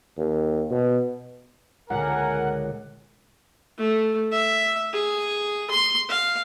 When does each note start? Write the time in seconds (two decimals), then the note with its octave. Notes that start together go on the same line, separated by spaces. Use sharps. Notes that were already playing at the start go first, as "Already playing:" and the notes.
0.17 D#2
0.70 B2
1.90 C#2 A#2 D3 A#4 F#5 G#5
3.78 A3
4.32 E5
4.93 G#4
5.71 C6
6.09 F5